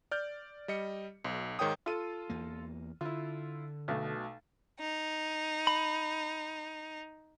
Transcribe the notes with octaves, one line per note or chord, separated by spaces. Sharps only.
D5 F6 G6
G3 D#5 C#7
B1
G#2 D#3 C#5 G5 D#6
F4 A4 D#7
E2 A#3
D3 E4 F4
B1 B2 A3
D#4
B5